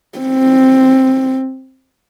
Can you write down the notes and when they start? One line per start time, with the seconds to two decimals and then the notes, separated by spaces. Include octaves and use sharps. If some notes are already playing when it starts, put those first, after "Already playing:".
0.18 C4